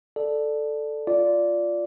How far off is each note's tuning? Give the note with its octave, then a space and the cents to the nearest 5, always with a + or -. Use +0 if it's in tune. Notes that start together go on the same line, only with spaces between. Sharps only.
A4 +0 D5 +10
F4 +0 D5 -10